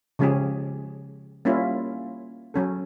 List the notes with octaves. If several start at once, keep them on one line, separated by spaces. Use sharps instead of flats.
C#3 F3 G#3 C#4 G4 G#4
G3 A#3 C#4 E4 F4
F#3 C#4 A4